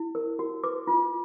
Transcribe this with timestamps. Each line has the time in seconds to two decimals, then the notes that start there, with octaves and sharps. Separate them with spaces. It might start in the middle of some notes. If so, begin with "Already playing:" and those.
Already playing: E4
0.15 A#4
0.39 F#4
0.64 B4 D6
0.87 F4